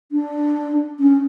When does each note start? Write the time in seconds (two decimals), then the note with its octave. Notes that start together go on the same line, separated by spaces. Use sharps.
0.11 D4
0.99 C#4